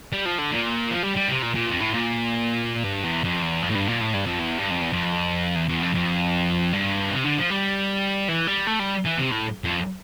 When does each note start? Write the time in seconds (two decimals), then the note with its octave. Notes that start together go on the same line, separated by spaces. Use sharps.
0.12 G3
0.25 F3
0.38 D3
0.52 A#2
0.91 F3
1.03 G3
1.16 G3
1.29 C3
1.43 A#2
1.55 A#2
1.67 F2
1.80 A2
1.94 A#2
2.84 G2
3.04 E2
3.24 F2
3.42 E2
3.62 F2
3.70 A2
3.75 G2
3.88 A#2
4.01 A2
4.14 G2
4.27 F2
4.40 E2
4.59 G2
4.71 F2
4.82 E2
4.93 F2
5.56 E2
5.69 E2
5.82 F2
5.94 F2
6.73 G2
7.11 C3
7.24 D3
7.37 F3
7.50 G3
8.28 E3
8.47 G3
8.67 A3
8.80 G3
9.06 E3
9.19 C3
9.31 A2
9.64 F2